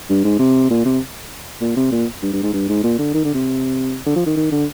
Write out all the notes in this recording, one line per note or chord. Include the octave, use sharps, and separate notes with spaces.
G2
G#2
C3
A#2
C3
A#2
C3
A#2
G2
G2
G#2
G2
G#2
A#2
D3
D#3
D3
C3
D3
F3
D#3
D#3
D3